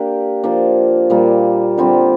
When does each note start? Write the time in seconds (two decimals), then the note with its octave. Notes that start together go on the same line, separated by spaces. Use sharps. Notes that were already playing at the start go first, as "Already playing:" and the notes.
Already playing: A#3 D4 G4
0.44 F3 A#3 D4
1.10 A#2 G3 A#3
1.77 D3 G3 C4 F4